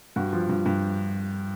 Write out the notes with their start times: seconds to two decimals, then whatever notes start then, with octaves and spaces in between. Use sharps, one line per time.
0.16 G2 F#4
0.33 F3
0.49 G2
0.66 G2